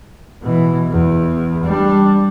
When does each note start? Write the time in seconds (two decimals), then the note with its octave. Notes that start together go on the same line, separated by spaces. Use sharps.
0.43 B2 E3
0.91 E2
1.64 G3 D4